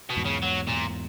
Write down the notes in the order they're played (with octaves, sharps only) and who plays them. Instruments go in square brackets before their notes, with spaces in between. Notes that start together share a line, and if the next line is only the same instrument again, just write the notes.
[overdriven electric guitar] B2
[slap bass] E2 G#2
[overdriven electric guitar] C#3
F#3
A#2